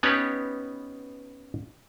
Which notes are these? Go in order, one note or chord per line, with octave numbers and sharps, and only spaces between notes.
B3 C#4 D#4 G4 B4 C#5